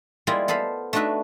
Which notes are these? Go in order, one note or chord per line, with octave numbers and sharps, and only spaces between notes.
G3 G#3 A#3 E4 F4 G#4
B3 A4 C5 F5 B5
A3 D4 D#4 F#4 B4 E5